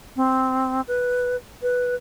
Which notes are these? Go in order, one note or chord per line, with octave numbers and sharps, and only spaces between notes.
C4
B4
B4